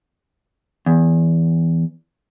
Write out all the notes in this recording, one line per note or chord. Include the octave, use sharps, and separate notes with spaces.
E2